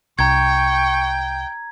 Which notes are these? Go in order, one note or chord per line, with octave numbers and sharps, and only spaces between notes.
C2 G5 A#5 C#6 G#6